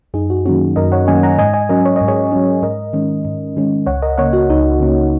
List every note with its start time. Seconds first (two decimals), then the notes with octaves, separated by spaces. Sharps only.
0.14 F#2 D#4 G#4
0.30 F#4
0.45 D#3 F#3 A#3 C#4 F#4
0.76 F#2 A#4 D#5
0.92 C#5 F#5
1.07 D#3 F#3 A#3 C#4 D#5 G#5
1.23 F#5 A#5
1.38 G#2 D#5 G#5
1.54 D#5 G#5
1.69 F#3 C#4 A#4 D#5
1.85 C#5
1.96 D#5
2.01 G#2
2.08 G#4 C#5
2.32 F#3 C#4
2.63 G#2 A#4 D#5
2.93 D#3 G#3 C#4
3.25 G#2
3.57 D#3 G#3 C#4
3.86 C#2 C#5 F#5
4.02 A#4 D#5
4.18 C#3 A#3 C#5 F#5
4.33 F#4
4.49 C#2 D#4
4.80 C#3 A#3